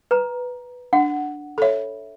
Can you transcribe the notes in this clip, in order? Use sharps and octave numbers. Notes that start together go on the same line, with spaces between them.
B4 A#5
D4 F#5
A4 C#5 E5 B5